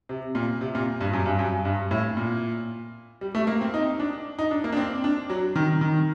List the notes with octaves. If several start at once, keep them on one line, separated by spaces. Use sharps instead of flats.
C3
A#2
C3
A#2
G2
F#2
G2
F#2
G2
A2
A#2
G3
A3
A#3
C4
D#4
D4
D#4
D4
A#3
D4
C4
D4
F#3
D#3
D#3